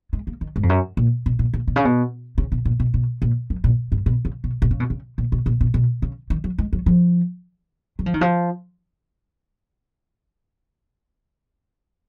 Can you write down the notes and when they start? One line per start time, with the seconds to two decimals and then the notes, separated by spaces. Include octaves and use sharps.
0.13 G#3
0.27 A#3
0.41 D#3
0.56 G#2
0.63 F2
0.69 F#2
0.97 A#2
1.26 B2
1.39 A#2
1.54 A#2
1.68 B2
1.76 C#3
1.85 B2
2.38 C#3
2.52 B2
2.65 A#2
2.80 B2
2.94 B2
3.22 A#2
3.50 F#2
3.64 A#2
3.92 G#2
4.06 B2
4.25 C#3
4.44 B2
4.62 B2
4.71 C#3
4.80 B2
4.90 C#3
5.18 A#2
5.32 B2
5.46 A#2
5.61 B2
5.74 B2
6.02 C#3
6.30 D#3
6.44 F#3
6.58 G#3
6.73 F#3
6.86 F3
7.99 F#3
8.06 F3
8.14 D#3
8.21 F3